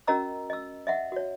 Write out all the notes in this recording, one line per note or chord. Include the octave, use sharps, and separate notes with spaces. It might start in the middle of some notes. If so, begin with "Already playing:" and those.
C#4 F#4 A#4 D#5 A#5 E6
D#5 E6
D#5 E5 F#5
F#4 C#5